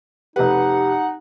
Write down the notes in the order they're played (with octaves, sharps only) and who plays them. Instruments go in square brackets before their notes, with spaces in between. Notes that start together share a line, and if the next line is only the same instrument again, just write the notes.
[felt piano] F1 B4 [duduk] D#4 [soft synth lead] G4 [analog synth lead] F#5